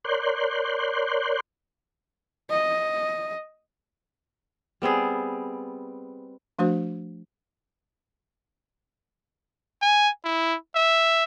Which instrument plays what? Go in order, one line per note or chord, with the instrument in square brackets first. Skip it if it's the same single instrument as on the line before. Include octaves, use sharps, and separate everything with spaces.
[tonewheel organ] A#4 C#5 D5 C6 F#6 G6
[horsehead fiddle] D#5
[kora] G3 B3 C4 G#4
[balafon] F3 A3 D4 F#4 C5
[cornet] G#5
E4
E5